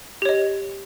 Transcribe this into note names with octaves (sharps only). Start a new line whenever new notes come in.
G4 C#5 D#5